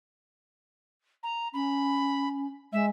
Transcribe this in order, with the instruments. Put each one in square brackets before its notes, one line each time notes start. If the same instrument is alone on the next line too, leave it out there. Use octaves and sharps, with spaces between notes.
[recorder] A#5
[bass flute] C#4 [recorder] B5
[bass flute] G#3 [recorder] E5